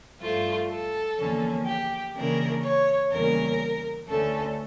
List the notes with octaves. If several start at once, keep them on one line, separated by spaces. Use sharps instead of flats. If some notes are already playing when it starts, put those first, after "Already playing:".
G2 F3 A3 F4
A4
E2 D3 F3 A#3 C#4
G4
C#3 E3 A#3 D4 A#4
C#5
E2 C#3 G3 A#3 C#4 A#4
D2 D3 A3 C#4 A4